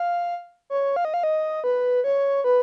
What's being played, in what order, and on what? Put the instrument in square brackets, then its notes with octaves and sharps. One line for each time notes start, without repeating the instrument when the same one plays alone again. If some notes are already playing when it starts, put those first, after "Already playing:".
Already playing: [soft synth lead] F5
C#5
F5
D#5
F5
D#5
B4
C#5
B4